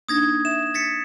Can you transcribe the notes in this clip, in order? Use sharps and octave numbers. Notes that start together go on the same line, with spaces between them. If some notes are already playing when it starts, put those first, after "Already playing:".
A#3 D4 D#4 D#6 G#6 A#6
E5 E7
A6 B6 C#7